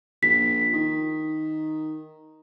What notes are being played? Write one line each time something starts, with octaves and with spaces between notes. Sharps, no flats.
A#1 B6
D#3